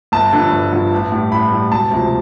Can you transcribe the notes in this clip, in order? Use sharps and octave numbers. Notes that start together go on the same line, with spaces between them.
G1 A5
G2 D3 F3
G1
G2 D3 F3
A1
A2 G3
A1 B5
A2 G3
E1 A5
D2 C3 F3